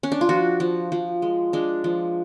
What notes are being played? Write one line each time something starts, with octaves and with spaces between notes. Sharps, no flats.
C#4
D4
F4
F3 F#4
F3
F3
G#3
G#3 D4
F3